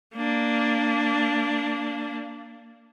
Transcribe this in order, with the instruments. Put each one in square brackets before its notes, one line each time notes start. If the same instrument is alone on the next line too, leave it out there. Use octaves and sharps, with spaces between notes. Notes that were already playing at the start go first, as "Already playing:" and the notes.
[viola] A#3 D4